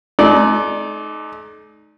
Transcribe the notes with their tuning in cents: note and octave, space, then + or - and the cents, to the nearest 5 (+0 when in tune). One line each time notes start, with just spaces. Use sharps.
A3 -45 D#4 +0 D5 +0